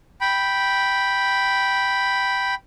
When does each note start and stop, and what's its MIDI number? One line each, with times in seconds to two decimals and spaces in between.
0.21 2.55 79
0.21 2.55 83